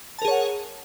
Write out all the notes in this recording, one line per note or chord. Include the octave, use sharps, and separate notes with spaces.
G#4 A#4 C#5 F#5 A5